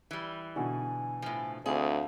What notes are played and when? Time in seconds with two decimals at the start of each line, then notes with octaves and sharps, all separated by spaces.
0.11 E3 G3
0.56 B2 D3 F#4 G#5
1.22 A2 F3
1.66 D2 C4 D4 G#4 F5